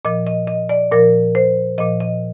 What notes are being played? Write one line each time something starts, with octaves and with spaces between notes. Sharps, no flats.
A#2 F3 D#5
D#5
D#5
D5
A#2 F3 A#4
C5
A#2 F3 D#5
D#5